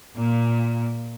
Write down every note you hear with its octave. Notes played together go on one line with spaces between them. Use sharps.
A#2